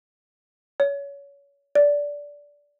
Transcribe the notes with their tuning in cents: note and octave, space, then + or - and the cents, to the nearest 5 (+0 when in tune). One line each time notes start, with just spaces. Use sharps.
C#5 +25
D5 -15